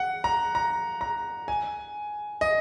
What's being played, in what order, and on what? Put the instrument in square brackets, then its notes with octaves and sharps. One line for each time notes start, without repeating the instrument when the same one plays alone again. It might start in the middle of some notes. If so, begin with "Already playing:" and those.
Already playing: [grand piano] F#5
A#5
A#5
A#5
G#5
D#5